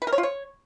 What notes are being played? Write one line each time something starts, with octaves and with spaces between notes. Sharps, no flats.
B4
A#4
C#5
F4
C#5